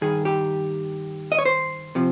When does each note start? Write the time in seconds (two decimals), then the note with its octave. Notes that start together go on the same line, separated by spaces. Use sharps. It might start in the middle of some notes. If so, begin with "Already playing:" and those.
0.01 G2 D#3 G#4
0.25 G4
1.32 D#5
1.39 C#5
1.46 C5
1.95 C3 F3